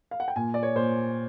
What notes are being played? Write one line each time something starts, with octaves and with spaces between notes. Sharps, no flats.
F5
F#5
G5
A#2 G#5
D5
C#5
A#2 C5